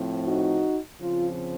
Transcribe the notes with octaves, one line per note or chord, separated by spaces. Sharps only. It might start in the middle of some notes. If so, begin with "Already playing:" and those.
Already playing: A2 F3 C4
D#4 F#4
C#3 F3 C4 F4